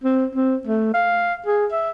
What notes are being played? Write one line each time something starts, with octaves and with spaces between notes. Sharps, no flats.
C4
C4
A3
F5
G#4
E5